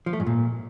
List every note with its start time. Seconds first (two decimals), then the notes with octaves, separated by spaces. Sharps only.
0.06 F3
0.13 A3
0.20 G#2
0.26 A#2